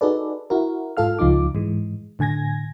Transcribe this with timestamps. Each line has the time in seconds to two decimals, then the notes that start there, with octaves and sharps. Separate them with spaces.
0.01 D#4 F#4 G#4 A4 B4 D5
0.50 E4 F#4 A#4
0.97 G#2 F4 A4 F5 F6
1.19 C#2 F3 D#4 F4 D6
1.55 G#2 E3 G#3
2.19 A2 D3 G#5 G#6 A#6